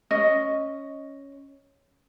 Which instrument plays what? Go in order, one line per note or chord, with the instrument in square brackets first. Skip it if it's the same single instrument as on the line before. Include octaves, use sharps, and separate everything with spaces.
[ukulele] C#4 D#5